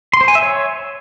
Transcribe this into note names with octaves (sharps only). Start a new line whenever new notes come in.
C6
C5
G#5
E5
C#5